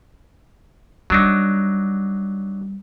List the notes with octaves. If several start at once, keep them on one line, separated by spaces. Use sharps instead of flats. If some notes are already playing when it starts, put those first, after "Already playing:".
F#3 G3 D4 D#4